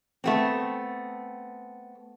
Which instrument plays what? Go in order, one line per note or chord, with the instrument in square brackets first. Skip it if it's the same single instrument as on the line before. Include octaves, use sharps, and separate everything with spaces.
[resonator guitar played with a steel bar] A3 B3 C4